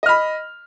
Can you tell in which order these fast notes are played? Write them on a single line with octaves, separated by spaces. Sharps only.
D#5 F6 B5